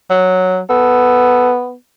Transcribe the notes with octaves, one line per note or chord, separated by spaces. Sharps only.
F#3
B3 A4